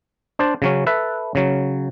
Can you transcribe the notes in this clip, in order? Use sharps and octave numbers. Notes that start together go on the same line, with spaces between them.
D4 C5 A5
C#3 F#3 C#4
A4 B4 E5
C#3 F#3